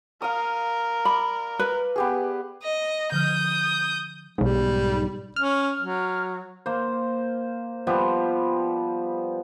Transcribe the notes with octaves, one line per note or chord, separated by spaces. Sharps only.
A#4 F5 D#6
D5 B5
B4
B3 G4 G#4
D#5
D3 F3 D#6 F6 G6
B1 G#2 G3
C#4 F6
F#3
A#3 C5
F3 G3 B3